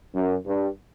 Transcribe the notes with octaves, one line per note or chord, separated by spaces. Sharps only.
F#2
G2